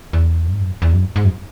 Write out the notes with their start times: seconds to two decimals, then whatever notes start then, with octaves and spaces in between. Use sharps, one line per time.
0.13 E2
0.48 F#2
0.53 G#2
0.60 F#2
0.82 E2
0.93 F#2
1.16 G#2
1.25 F#2